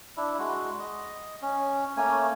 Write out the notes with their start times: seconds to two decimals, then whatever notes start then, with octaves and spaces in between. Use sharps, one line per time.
0.17 D4 E4
0.39 G#3 F#4
0.80 D#5
1.42 C#4
1.97 A3 A#3 C#4 G#5